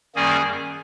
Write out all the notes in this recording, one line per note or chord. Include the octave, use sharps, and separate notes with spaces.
F#2 D#3 G3 A#3 C#4 G#4 G#5